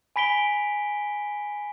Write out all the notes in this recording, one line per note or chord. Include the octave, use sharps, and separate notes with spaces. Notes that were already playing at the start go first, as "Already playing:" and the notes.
G#5 B5 B6 D7 G7